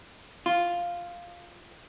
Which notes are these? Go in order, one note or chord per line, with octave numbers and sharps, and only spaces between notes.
F4